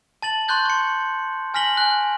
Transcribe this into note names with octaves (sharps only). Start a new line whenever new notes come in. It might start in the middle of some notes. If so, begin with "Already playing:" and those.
A5 A6 F#7
A5 C6 C#6 F#6 G6 A6
C#6 C#7
G#5 F6 A#6 B6 F#7 G7
G#5 F#6